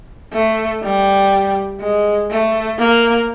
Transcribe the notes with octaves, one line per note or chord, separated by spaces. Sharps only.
A3
G3
G#3
A3
A#3